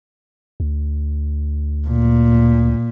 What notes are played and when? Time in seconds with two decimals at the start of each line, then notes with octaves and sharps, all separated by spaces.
0.60 D2
1.87 A#2